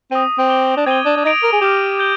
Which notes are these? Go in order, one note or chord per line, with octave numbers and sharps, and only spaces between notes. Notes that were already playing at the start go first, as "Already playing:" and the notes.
C4 D#6 A#6 D#7
C4
D6 G6 D7 G7
D4
C4 G#6 D#7 G7
D4
D4
D#4 D#6 A#6 D7 F7
A#4
G#4
G4 D6 F6 A#6
G6 D7 G7